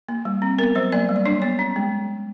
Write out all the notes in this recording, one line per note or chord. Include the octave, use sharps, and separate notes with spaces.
A#3
G3
C4
B3 A#4
F#3 C5
A#3 D5
G3
D5
D4 C#5
B3 C#5
C#4
G#3